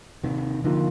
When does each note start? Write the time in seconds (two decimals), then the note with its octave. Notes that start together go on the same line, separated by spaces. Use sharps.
0.23 D#2 C3 D#3
0.64 D3 D#3 F3 A#3 F4